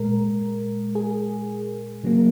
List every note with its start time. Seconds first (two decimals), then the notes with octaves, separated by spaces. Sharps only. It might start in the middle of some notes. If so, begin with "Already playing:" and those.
Already playing: A#2 G#3 A#4
0.95 G#4
2.04 C#3 F#3 A#3